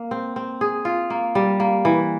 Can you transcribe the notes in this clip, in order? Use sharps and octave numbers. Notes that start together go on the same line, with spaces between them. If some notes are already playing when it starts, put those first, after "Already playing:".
Already playing: A#3
C4
C4
G#4
F4
A#3
G3
A#3
E3